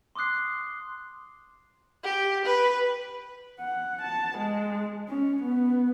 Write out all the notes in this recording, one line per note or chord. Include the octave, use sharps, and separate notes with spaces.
C6 D6 D#6 F#6 C7
G4
B4
F#5
A5
G#3
C#4
B3